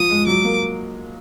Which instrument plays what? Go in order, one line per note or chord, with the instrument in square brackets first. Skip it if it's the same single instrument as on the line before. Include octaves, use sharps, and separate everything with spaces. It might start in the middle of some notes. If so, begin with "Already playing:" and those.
Already playing: [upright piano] F3 [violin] D#6
[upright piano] G#3
[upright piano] F#3 [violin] D6
[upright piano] A#3